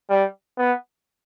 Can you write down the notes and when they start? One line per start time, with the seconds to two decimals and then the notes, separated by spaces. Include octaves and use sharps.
0.10 G3
0.58 B3